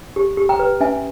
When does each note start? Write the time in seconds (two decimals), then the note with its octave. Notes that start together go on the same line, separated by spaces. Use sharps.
0.16 G4
0.37 G4
0.49 G5 A#5
0.59 B4
0.80 C#4 E5 G#5